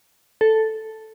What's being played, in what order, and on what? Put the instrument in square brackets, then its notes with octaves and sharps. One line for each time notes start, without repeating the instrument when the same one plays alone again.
[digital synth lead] A4